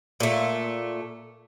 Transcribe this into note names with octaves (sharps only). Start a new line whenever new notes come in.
A#2 A3